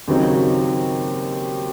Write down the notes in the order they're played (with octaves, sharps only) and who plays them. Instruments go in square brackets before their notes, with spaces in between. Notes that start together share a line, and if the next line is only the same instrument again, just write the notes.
[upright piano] D#2 C#3 F#3 C4 D#4